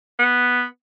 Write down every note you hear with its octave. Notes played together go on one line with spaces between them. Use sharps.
B3